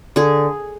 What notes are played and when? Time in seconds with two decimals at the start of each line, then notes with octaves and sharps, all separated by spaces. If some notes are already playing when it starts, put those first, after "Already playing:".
0.16 D3 G#4